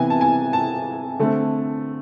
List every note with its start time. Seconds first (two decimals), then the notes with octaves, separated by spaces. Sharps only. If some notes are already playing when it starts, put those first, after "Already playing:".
Already playing: C3 E3 B3 G#5
0.10 A5
0.21 G#5
0.53 A5
1.19 D3 A3 C4